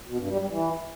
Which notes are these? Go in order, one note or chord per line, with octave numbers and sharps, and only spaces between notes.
B2
G2
G3
G3
E3